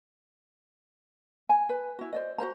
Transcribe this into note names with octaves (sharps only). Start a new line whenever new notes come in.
G#5
B4
E4 F#4
C5 D5 D#5
F#4 A#4 C5 A#5